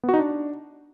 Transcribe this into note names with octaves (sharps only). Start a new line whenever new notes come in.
B3
F#4
D#4
D4